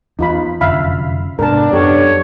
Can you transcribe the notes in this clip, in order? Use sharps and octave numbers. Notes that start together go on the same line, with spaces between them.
E2 D#4 F4 B5
F1 F#2 D3 E5 F5 B5
G#2 C3 B3 D4 A#4 A5
F#2 G4 A4 C#5